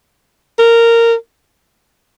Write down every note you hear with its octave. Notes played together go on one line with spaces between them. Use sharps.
A#4